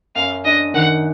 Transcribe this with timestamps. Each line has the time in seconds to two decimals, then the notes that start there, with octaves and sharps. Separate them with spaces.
0.15 F#2 F5
0.44 D4 D#5
0.74 D#3 F#5